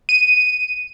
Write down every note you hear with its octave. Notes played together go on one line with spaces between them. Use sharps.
D#7